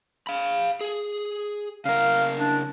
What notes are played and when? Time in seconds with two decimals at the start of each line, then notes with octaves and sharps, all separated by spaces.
0.27 F5 B5
0.81 G#4
1.85 C#3 A#4 F5
2.37 D4